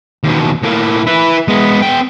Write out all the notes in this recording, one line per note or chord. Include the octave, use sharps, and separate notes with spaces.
D#2 B2
A2 A#3
E4 B4
G#3 B3
B3 G5